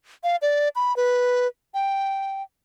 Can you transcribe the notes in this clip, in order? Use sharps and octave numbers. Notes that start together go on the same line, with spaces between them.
F5
D5
B5
B4
G5